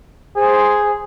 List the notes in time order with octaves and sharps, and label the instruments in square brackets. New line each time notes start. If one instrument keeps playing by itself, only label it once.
[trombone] G#4 [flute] C5